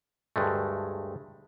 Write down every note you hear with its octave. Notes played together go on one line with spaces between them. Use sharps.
D2 G2 G#3 A3